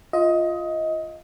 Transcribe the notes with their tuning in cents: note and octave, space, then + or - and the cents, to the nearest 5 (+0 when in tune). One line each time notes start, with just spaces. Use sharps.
F4 +0 D#5 +20